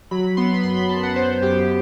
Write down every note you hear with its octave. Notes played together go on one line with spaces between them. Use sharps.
F#3 B5
B3 C6
B5
F#2 C6
B5
F#2 A5
F#5
B3 C5
F#2 G4